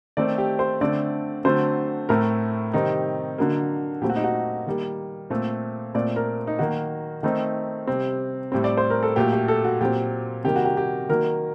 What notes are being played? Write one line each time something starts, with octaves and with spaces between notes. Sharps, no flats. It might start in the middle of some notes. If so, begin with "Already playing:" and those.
D#3 A3 C4 D5
G4
C5
D3 A3 C4 D5
D3 F#3 A3 C4 C5
A2 A3 C4 A#4
C3 D#3 G3 C4 D#4
D3 F#3 A#3
A#2 F#3 A3 C4 G4
F#4
D#4
F#4
D#3 G3 A#3
A#2 A3 C4
A#2 A3 C4 D5
A#4
D#4
D#3 F#3 A#3 F#4
D#3 A3 C4 D#4
C3 G3 C4
A2 G3 C4
D5
C5
A#4
A4
A#2 F#3 A3 G4
G4
A4
F#4
A#2 F#3 C4 G4
C3 D#3 G3 A#3 G4
F#4
G4
G4
D#3 F#3 A#3 A#4